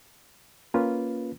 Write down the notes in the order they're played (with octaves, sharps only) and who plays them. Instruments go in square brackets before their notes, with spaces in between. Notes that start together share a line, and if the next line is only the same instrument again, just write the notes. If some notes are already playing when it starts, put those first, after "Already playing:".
[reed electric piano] A#3 C#4 F4 B4